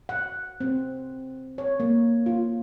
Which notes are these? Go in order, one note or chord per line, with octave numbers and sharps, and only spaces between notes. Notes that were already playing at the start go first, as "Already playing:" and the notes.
F#5
C4
C#5
A#3
F4